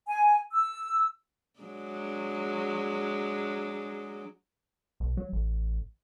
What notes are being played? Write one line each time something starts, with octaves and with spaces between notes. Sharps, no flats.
G#5
E6
F#3 G#3 D4
B1
F#3
A1